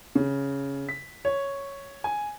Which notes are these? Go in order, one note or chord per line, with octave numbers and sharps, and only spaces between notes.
C#3
B6
C#5
G#5